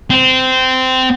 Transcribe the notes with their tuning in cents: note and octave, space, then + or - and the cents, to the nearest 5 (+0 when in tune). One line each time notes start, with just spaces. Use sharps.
C4 -15